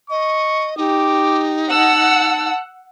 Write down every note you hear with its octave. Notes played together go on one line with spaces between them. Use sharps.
D#5 C#6
D#4 G4 D6
F#5 A5 E6